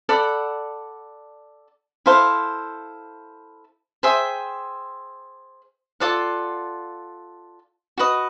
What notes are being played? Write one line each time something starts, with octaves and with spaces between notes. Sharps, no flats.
A4 D5 F#5 B5
E4 A4 C5 F5
G#4 C5 E5 G5
F4 A4 D5 F#5
F#4 B4 D#5